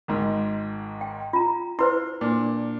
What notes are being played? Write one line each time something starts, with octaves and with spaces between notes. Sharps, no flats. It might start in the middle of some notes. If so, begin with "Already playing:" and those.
G#1 G#2
G5
F4 A#5
E4 B4 C5 C6
A#2 D4